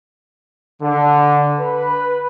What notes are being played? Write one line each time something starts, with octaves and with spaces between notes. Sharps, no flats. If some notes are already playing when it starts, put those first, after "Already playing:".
D3
B4